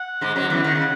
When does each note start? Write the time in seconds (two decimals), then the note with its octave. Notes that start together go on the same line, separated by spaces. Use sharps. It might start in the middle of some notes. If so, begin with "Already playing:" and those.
Already playing: F#5
0.21 G#2 G#3
0.36 F#2 F#3
0.50 E2 E3
0.64 D#3
0.75 C#3